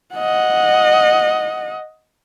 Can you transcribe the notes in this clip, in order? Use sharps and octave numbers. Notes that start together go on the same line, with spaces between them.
D#5 F#5